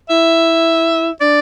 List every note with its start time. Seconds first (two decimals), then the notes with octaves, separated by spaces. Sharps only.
0.09 E4 E5
1.21 D4 D5